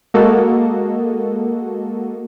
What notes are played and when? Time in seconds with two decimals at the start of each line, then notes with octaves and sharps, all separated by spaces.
0.14 G#3 A#3 F#4 A4 D#5